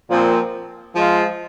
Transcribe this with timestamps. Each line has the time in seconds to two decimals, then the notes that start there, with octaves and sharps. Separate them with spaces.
0.10 A#2 F3 C4
0.94 F3 G#3 F4